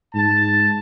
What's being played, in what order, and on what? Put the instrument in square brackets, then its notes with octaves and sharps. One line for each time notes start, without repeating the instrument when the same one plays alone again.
[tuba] G#2 [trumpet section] A5